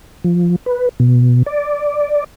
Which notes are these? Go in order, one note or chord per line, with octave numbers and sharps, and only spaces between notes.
F3
B4
B2
D5